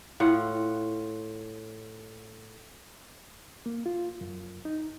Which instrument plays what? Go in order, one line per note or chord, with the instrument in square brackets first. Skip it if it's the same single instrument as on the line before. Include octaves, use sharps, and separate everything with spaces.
[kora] A2 F4 F#5
[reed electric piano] A#3
F4
F#2
D#4